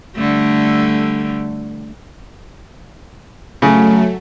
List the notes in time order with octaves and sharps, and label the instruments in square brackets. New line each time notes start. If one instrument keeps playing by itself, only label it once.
[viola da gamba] D3 G3 A3
[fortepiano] C#3 [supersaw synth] F#3 A3